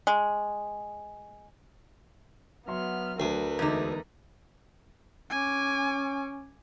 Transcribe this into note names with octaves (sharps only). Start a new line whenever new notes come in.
G#3
F#3 B3 E5 C6 F6
D2 A#4 B4
E2 D3 G#3 D#4 A4 D6
C#4 G#5 D6